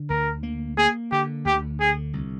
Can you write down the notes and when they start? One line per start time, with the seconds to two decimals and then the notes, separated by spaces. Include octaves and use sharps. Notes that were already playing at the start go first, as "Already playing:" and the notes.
Already playing: D3
0.10 D2 A#4
0.43 A#3
0.78 A#3 G#4
1.11 D3 G4
1.45 D2 G4
1.80 D3 G#4
2.13 C2